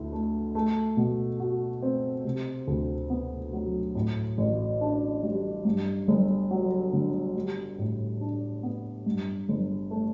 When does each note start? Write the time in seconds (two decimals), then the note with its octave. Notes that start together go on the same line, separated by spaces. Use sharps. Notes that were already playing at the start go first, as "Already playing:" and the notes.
Already playing: D2 E4
0.12 A3
0.55 A3
0.97 B2
1.40 F#4
1.82 C4
2.25 C3
2.67 D2
3.10 B3
3.53 F#3
3.95 A2
4.38 A1
4.81 D4
5.23 G3
5.65 G2
6.08 G1
6.51 F#3
6.93 D3
7.36 G3
7.78 A2
8.21 D4
8.63 B3
9.06 G2
9.49 G1
9.91 A3